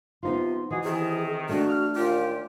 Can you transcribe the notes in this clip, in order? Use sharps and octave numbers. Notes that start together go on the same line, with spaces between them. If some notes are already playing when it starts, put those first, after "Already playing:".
C3 F3 B3 D#4 F4 C6
E3 D#4 F#4 G#4
C3 D#3 G#4
A3 D4 F#4
F6
D#2 A#2 F4 G4